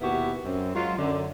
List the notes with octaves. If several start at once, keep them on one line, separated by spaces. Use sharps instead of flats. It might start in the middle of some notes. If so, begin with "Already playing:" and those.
D#2 B2 B3 E4 F#4 G4
F#2 C4
F#3 G#3 F4
F#2 D3